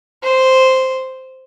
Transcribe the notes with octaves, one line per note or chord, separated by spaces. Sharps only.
C5